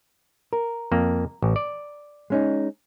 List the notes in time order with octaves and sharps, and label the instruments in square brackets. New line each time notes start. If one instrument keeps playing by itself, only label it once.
[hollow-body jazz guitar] A#4
[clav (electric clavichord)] F2 A#3
A1
D5
[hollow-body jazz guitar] G#3 C#4 D#4